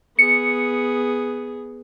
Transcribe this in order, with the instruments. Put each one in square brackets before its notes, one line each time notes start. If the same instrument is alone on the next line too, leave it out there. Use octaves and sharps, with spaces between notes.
[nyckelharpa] B3 G#4 [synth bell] C#7